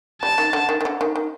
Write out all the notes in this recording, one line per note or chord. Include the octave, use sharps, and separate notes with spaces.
G3 A5
D#3
D3
D#3
D#3
D3
D#3
D#3